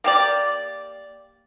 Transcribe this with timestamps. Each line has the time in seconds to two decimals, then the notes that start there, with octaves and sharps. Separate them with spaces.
0.04 A#3 G4 D5